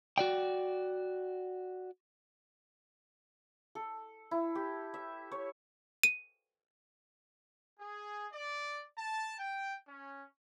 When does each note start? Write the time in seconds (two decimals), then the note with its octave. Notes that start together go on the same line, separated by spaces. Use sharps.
0.18 F#4 D5 G5
3.75 A4
4.31 E4
4.55 G4
4.94 E5
5.32 C#5
6.03 D#7
7.80 G#4
8.33 D5
8.99 A5
9.39 G5
9.88 C#4